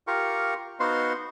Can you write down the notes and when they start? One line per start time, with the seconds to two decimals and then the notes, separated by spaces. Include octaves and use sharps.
0.07 F4 G4 A#4 C#6
0.80 B3 D#4 F#4 C5 F5 C6